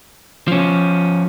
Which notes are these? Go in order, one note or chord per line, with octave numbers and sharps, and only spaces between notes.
F3 C#4